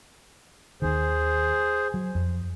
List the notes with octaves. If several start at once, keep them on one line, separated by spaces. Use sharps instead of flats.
D#2 D#3 G#4 C5
F#3
F2